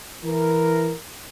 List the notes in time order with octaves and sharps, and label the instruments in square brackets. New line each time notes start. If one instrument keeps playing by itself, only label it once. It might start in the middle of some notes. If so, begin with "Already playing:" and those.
[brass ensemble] E3 A#4